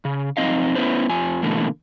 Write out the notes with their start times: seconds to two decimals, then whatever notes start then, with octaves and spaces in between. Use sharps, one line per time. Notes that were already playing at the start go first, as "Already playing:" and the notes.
0.05 C#3
0.37 F2 E3 C4 D#4 D#5 F5
0.75 B3 C#4 E4 B4 C5
1.09 F2 F3 G#5
1.43 B2 D3 E3 A3 A#3